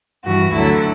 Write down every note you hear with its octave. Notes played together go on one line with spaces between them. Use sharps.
G2 E3 F#4
D2 D3 F#3 E4